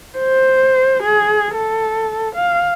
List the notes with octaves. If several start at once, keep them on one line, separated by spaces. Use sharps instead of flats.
C5
G#4
A4
F5